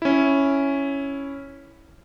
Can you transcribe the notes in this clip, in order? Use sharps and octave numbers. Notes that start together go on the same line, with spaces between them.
C#4 E4